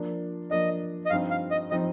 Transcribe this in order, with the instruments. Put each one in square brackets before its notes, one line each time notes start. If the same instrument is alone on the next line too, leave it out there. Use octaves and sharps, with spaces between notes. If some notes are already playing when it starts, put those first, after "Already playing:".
Already playing: [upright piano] F3 A#3 D4
[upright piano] F3 A#3 D4 [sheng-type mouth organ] D#5
[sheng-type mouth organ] D#5
[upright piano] G2 F3 C4 D#4 [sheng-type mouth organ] F5
[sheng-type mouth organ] F5
D#5
[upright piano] F3 C4 D#4 [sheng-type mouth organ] D#5